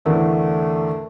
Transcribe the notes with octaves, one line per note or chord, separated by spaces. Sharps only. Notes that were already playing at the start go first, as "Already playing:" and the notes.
E2 A2 D3 A3 A#4